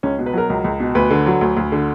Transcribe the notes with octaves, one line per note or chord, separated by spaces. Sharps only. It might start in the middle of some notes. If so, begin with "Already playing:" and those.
C#2 C#4
B2
B4
F#3 A#4
C#2
C#2
B2
D2 B4
D3
F#3
D2
D2
D3